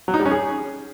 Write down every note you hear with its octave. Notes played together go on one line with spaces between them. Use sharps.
F#3
D#4
G3
C#4
G#4